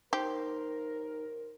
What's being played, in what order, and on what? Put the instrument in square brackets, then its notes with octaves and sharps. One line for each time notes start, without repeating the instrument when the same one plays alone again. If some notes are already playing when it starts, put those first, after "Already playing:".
[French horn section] D#2 A#4 [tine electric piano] D#4 [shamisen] G4 [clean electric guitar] C5